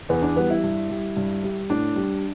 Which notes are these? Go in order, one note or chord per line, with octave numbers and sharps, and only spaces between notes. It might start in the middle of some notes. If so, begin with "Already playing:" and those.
E2 B3
D4
E3 G3 B3
E4
G2
G3
G2
G3
A2 D4
G3